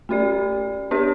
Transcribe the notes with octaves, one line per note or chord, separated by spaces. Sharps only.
A3 C#4 G4 D5
B3 D4 G4 C#5